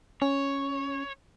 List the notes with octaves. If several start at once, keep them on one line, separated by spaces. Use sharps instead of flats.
C#4 C#5